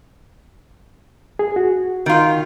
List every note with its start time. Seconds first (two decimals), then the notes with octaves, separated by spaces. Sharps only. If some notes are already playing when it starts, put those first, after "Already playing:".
1.39 G#4
1.56 F#4
2.06 D#3 F4